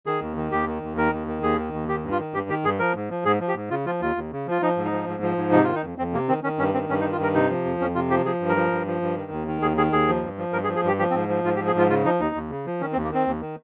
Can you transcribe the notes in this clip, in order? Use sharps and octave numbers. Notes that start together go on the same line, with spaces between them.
D#3 G#4
D#2
D#3
D#2 G4
D#3
D#2
D#3 A#4
D#2
D#3
D#2 G#4
D#3
D#2
D#3 G4
G2
F4
D#3
G2 G4
D#3 G4
G2 G#4
F3 A#4
G#2
F3
G#2 G#4
F3
G4
G#2
C#3 F4
F3 F4
D#2 F4
D#2
C#3
F3 F4
F3 D#4
G#2
D#4
F3
G#2
F3
G#2
C3 D#4
D#3 F4
D#4
F2
F2 C4
C3 A#3
D#3 C4
D#3 C#4
G2 C#4
D#3 C4
G2 C#4
D#4
D#3
F4
G2 A#4
C3 D#4
F3
F2
F2 C#4
C3 F4
F3 G4
F3 G#4
G2
A#4
F3
G2
F3
G2
D#3
D#2
D#3
D#2 G#4
D#3 G#4
D#2 G#4
F3
G2
F3
G2 A#4
G#4
F3
G#4
G2 G4
F3 G4
C4
G#2
F3
G#2 F4
G4
F3
G#4
G#2 F4
C#3 F4
F3 D#4
D#2 D#4
D#2
C#3
F3
D#3 C#4
C4
D#2
A#3
D#3 C4
D#2
D#3